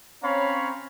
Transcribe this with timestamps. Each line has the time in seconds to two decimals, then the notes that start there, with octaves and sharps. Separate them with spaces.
0.23 C4 C#4 C#5 F5 A#5 B5